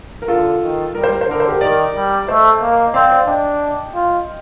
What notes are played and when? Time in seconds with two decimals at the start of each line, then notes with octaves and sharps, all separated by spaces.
0.22 A#4
0.28 D3 F4 A4
0.62 D#3
0.95 G3 A#4
1.04 C5
1.13 A#4
1.21 C5
1.28 D3 A#4
1.40 C5
1.48 G4 A#4
1.61 D#3 A#4 D5
1.95 G3
2.28 A3 C5 D#5
2.62 A#3
2.88 D#5
2.94 C4 D5 F5
3.11 D5 F5
3.27 D4 D#5 G5
3.94 F4